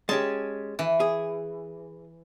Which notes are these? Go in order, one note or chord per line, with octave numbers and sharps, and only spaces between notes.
G#3 C#4 G4 A5
E3
G#4